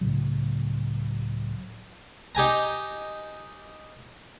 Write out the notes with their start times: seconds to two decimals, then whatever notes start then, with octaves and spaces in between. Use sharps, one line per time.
0.01 C#2 A2 C#3 F#3
2.35 D#4 G4 G#5 A#5